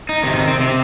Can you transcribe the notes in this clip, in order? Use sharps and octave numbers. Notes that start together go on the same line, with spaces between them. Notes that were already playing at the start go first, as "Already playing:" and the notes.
D#4
C3 D#3
C4
C3